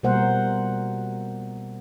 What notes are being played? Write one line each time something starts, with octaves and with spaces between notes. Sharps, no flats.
B2 G3 A#3 A#4 C5 F#5